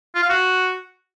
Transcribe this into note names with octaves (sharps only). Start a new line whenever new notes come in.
F4
F5
F#4